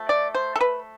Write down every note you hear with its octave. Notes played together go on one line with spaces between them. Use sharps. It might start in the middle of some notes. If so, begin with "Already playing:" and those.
Already playing: F3 A3
D5
C5
A4
B4